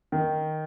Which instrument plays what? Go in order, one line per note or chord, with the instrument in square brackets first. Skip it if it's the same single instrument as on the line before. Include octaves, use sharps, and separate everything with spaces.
[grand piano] D#3